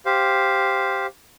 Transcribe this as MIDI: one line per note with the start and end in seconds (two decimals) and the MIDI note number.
0.06 1.06 67
0.06 1.06 72
0.06 1.06 77